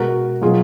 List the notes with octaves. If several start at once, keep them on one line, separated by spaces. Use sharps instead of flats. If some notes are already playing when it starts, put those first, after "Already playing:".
Already playing: B2 G#3 F#4 A#4
B2 F#3 F4 G#4